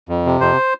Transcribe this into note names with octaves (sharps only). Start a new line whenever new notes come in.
F2
C3
F2 C5